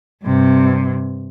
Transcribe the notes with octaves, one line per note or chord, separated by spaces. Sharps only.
G2 C3